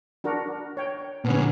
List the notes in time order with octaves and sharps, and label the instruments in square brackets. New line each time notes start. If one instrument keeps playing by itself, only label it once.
[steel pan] D4 F#4 A#4
C#5 G5
[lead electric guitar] A#2 D3 [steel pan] B3 C#4